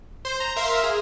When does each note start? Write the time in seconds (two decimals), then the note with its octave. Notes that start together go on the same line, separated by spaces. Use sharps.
0.25 C5
0.40 A#5
0.56 A#4 E5 F5 A#5 C6
0.83 G#4